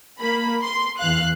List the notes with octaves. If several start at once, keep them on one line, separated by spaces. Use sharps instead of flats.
A#3 B5
C6
E2 E3 F5 F#6